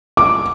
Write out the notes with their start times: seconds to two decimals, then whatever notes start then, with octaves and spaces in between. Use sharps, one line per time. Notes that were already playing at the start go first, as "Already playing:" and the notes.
0.17 D6